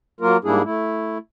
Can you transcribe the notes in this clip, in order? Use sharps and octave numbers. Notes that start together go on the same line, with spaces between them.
F#3 A#3 F4 A#4
G#2 G3 A#3 D4 E4 G#4
A3 E4